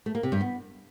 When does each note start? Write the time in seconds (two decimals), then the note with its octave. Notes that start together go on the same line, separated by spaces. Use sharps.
0.06 A3
0.15 A#3
0.23 C3
0.32 G2
0.41 B3